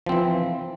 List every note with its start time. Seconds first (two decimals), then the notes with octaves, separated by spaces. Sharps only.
0.06 F3
0.09 C4
0.12 E3